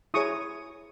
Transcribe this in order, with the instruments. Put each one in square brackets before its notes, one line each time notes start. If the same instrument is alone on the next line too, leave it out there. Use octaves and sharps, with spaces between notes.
[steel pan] E4 G#4 C#5 C#6 D#6